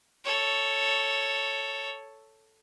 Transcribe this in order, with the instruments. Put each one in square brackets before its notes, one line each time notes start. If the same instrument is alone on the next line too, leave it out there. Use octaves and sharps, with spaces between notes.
[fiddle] A4 C#5